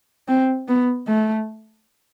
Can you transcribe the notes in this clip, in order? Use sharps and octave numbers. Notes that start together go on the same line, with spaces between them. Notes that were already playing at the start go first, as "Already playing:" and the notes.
C4
B3
A3